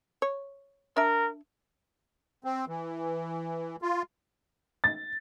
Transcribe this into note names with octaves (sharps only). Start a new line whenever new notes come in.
C#5
D4 A#4 E5
C4
E3
F4
A6